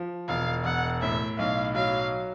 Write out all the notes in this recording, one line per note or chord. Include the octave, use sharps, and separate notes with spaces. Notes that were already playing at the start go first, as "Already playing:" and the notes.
Already playing: F3
E1 F5
E1 F#5
A2 E5
B1 F5
F#3 F5